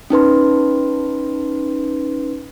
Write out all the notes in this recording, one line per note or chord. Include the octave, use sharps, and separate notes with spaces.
C#4 D#4 B4 C6